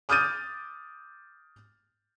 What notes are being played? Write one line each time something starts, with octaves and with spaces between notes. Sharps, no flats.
D6 D#6 F6 G6 A6 D#7